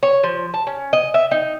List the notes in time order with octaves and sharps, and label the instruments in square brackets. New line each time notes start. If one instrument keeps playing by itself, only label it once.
[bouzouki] C#5
F3
A5
C#4
D#5
E5
D#4